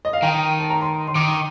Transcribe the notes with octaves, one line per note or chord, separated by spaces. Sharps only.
D#5
F5
D#3 G5
A5
A#5
C6
C6
D#3 D6